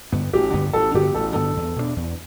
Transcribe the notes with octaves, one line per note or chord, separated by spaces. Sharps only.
G2 D3 B3
A1 G4
G2 D3 B3
A1 A4
G2 D3 B3 G4
A1 A4
G2 D3 B3 A4
E2
B2 A3 D4
E2